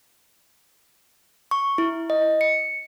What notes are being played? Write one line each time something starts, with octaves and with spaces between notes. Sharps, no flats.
C#6
E4
D#5
C#7